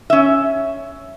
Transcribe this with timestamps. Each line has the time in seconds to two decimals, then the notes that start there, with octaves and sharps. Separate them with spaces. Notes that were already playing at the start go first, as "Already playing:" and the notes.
0.10 C#4 E5